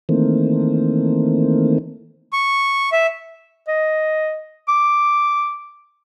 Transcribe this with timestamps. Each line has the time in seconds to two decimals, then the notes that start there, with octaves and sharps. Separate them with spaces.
0.09 D#3 E3 A3 A#3 C4
2.33 C#6
2.92 E5
3.68 D#5
4.68 D6